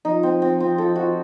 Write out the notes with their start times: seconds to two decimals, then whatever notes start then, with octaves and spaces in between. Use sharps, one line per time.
0.05 F3 D#4
0.23 C4
0.42 C4
0.60 C4
0.78 A4
0.96 F#4